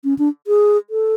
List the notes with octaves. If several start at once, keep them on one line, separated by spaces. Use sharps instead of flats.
C#4
D4
G#4
A4